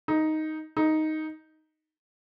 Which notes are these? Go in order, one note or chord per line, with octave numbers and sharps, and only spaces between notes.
D#4
D#4